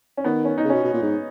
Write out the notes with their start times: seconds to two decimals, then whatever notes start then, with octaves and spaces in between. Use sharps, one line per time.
0.17 C#4
0.24 D#3 B3
0.45 C#4
0.58 D#4
0.64 C#3
0.70 B2 C#4
0.84 B2
0.93 A#2
1.02 G#2